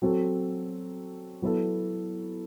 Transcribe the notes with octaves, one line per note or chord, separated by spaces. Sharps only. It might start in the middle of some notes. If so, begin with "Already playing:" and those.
F#3 C4 F#4 A4
F#3 B3 E4 A4